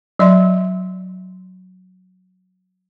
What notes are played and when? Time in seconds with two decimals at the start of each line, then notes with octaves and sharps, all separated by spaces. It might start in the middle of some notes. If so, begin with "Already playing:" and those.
0.19 F#3 D5 E5 C6